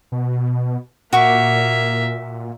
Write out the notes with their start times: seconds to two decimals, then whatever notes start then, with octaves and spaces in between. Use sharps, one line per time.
0.12 B2
1.13 A#2 A#3 F#4 E5 C#6 D6